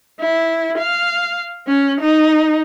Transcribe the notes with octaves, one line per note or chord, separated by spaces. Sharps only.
E4
F5
C#4
D#4